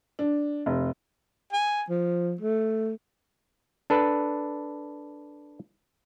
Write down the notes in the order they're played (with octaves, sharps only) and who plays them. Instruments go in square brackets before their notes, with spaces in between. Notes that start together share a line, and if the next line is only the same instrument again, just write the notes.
[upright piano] D4
F1
[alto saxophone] G#5
F3
A3
[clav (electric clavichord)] D4 A4 B4